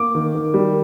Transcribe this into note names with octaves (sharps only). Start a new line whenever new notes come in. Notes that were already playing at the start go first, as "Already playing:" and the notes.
Already playing: A#3 D6
D#3
D#3
G3